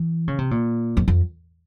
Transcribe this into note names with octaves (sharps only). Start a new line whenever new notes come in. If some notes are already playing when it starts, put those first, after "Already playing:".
Already playing: E3
C#3
C3
A#2
F2
F2